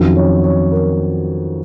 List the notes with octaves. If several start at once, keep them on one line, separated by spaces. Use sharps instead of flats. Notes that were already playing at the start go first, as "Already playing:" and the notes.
Already playing: F2 D#3 F#3 C#4
C#5
C#5
A#4